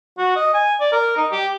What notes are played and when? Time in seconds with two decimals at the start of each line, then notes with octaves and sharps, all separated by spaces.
0.18 F#4
0.36 D#5
0.54 G#5
0.80 D5
0.92 A#4
1.17 D#4
1.32 G4